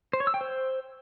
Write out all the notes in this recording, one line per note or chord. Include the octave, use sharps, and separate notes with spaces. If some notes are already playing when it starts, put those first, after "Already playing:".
C5
C#5
E6
G5
C5